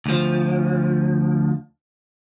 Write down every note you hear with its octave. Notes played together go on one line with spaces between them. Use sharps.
D2 F3